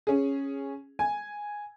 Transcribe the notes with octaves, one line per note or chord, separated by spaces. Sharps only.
C#4 G#4
G#5